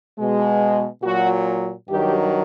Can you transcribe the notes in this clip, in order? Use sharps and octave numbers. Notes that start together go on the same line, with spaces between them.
B2 G#3
A#2 F#3 F#4
G2 D#3 F#3 G4